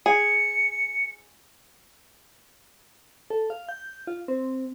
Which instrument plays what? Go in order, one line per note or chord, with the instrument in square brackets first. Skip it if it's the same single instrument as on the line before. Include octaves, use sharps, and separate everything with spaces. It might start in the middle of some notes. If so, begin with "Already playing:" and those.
[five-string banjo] G#4 [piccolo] C#7
[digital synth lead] A4
F5
G6
F4
C4